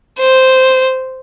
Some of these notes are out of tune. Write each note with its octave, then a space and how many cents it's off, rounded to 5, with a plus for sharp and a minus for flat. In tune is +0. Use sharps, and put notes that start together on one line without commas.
C5 -5